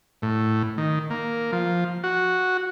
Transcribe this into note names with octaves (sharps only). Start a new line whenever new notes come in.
A2
D#3
A#3
F3
F#4